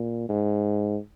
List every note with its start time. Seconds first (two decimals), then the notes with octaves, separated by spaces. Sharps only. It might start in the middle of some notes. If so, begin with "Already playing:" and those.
Already playing: A#2
0.29 G#2